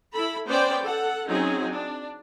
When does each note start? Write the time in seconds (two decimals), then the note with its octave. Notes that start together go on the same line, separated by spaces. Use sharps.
0.13 E4 A4 B5
0.46 B3 C#4 C5 D5 G5
0.83 A4 F#5
1.27 F#3 C4 C#4 D#4 G#4
1.71 D4